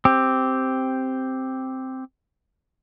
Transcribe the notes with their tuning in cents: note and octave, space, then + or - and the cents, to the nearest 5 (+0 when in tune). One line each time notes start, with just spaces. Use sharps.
C4 +0 G4 +0